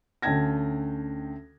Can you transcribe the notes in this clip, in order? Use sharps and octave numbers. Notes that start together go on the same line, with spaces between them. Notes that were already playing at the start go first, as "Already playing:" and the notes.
D2 C#4 G5 A5 G#6 A#6